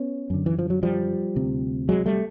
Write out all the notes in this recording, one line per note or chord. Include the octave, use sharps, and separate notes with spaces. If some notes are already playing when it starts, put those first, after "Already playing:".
Already playing: B3 C#4
F#2 D3
E3
F3
F#3
F3 G3
D2 C3
F#3 G#3
G3 A3